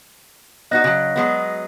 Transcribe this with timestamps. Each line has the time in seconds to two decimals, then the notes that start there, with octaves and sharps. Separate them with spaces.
0.71 B3 D#4 F#4 D#5 F#6 A#6
0.84 C#3 F#3
1.16 F#3 G#3 B3